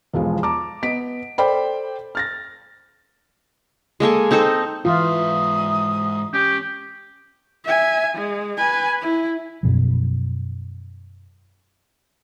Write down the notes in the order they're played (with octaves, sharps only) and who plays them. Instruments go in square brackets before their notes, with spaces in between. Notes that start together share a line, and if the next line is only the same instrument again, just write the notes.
[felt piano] E1 B1 F3 G#3
A5 A#5 D6
B3 D#5 B6 D7
A4 C5 D5 G5 B5
F6 A6 A#6
[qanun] G#3 A#3 A4 G#5
C4 D#4 A4 C5
[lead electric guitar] G#2 E5 [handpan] E3 F4 [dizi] D#6
[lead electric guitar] C#4 [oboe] G4
[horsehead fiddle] E5 G#5
G#3
B4 G#5
E4
[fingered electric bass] F#2 B2 F3